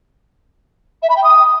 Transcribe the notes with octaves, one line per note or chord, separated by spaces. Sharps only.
E5
B5
G5
D#6